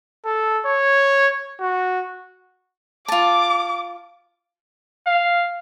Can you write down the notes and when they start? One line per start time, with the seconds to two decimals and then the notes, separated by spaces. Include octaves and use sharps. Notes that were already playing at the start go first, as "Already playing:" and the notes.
0.25 A4
0.65 C#5
1.60 F#4
3.08 F4 A5 D6
5.06 F5